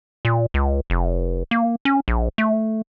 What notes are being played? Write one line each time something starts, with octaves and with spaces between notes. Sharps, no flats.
A#2
C#2
F1
A#3
C#4
A#1
A3